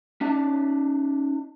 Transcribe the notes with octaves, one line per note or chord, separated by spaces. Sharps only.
C#4 D#4 D5 A5